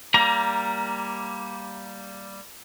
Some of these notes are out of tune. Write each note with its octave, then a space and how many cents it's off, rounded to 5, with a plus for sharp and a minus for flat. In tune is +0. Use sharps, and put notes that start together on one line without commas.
G3 +0 A#3 +0 A#5 +20